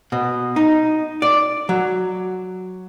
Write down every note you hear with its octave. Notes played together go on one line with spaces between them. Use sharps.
B2
D#4
D5
F#3